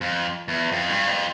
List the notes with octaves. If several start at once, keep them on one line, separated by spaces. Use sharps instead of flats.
F2
E2
F2
G2
F2